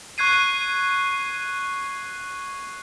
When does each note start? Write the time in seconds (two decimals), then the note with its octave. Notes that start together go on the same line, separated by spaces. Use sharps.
0.18 C#6 F#6 G#6 C7 D#7